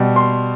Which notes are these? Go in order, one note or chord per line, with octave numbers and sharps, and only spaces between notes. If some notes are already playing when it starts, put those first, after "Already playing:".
Already playing: B2 G3
C6